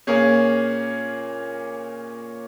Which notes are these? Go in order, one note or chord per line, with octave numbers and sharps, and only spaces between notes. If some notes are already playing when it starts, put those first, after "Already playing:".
A#2 A#3 C#4 G#4